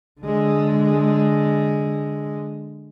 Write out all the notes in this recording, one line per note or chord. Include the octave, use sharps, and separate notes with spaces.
D3 G#3